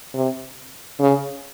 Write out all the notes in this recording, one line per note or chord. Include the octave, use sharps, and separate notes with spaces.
C3
C#3